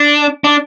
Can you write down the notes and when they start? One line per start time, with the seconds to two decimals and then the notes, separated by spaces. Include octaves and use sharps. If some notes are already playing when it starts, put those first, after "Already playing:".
Already playing: D4
0.44 D4